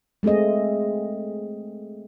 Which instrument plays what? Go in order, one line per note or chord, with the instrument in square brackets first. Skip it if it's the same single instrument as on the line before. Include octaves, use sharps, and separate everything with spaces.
[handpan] G#3 A3 C4 G#4 D#5